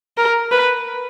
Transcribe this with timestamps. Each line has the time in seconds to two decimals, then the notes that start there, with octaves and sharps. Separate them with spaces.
0.17 A#4
0.51 B4